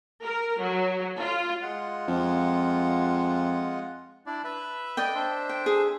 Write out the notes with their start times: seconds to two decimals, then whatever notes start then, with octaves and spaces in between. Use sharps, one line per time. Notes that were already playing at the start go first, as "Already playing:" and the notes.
0.24 A#4
0.60 F#3
1.19 F4
1.62 G#3 F4 F#5
2.08 F2
4.26 D4 E4 D5
4.44 B4 E5
4.97 D5 D#5 G5
5.15 D4 C5 E5
5.49 G5
5.66 G#4